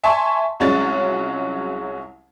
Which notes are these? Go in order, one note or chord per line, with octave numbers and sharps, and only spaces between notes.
E5 G#5 A5 C6 C#6
C2 F#3 G#3 C#4 F4 A6